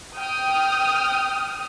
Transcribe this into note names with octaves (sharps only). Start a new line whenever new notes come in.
G5 D#6 F6